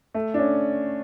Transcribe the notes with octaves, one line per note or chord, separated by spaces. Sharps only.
A3
D4
C#4